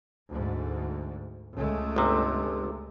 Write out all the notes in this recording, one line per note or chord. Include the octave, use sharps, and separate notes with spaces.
D2 G#2
C#2 G#3 A3
G1 C3